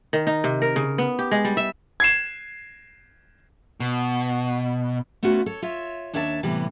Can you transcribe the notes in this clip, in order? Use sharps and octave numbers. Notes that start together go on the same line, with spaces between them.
D#3
D#4
C3
A#4
C#3
B3
G4
G#3
G3
E5
G#6 C7 E7
B2
A3 B3 C#4 F4 F#4
A4 C#5
F4 C#5 E5
D#2 D4 C#5 E5 F5 A5
A2 C3 E3 G3 B3